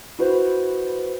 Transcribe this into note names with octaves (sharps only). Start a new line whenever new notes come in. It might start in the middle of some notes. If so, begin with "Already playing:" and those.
E4 F#4 B4 C5